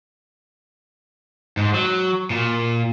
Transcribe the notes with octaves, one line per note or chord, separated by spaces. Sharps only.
G#2
F#3
A#2